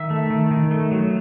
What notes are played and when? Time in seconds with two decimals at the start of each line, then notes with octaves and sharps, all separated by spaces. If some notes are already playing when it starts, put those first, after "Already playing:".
Already playing: D#3 E5
0.10 A3
0.30 D#3
0.51 D#3
0.71 A3
0.91 F#3